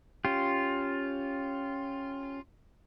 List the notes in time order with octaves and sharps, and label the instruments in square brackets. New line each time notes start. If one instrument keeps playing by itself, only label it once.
[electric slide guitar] C#4 G4 [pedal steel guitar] F4